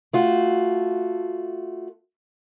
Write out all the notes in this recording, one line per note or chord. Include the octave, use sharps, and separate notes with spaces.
A3 F4 F#4